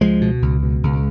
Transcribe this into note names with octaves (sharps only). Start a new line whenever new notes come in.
C#2 F3 G#3
B2
C#2
B2
C#2